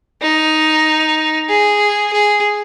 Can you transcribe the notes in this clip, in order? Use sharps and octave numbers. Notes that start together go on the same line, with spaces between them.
D#4
G#4
G#4